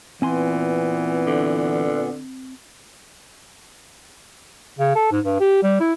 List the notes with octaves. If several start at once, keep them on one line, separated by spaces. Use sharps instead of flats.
A#2 E3 B3 C4 G#5 C6
D3
C#3
A4
G#2
G2
G4
G3
E4